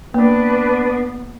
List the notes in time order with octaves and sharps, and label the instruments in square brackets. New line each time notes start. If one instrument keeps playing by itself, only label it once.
[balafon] A#3 [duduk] B3 [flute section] D4 B4